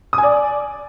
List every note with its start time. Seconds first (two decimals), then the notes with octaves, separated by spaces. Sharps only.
0.13 D#6
0.18 G#5
0.23 D5